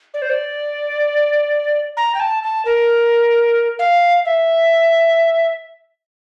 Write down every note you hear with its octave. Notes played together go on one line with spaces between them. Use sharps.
D5
C5
D5
A#5
G5
A5
A5
A#4
F5
E5